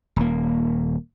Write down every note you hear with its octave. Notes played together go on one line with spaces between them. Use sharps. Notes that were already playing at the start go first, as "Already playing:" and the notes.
D#1 A#3